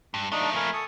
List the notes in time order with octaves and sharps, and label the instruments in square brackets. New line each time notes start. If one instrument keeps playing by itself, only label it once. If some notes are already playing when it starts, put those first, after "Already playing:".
[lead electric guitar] G2
[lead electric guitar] F3 A3 [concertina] D4 D#4
[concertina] A#4 G#5 B5
A4 C#6 D#6